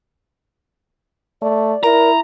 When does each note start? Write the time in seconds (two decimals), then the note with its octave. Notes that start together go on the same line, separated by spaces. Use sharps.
1.42 A3 D5
1.83 E4 A#4 A#5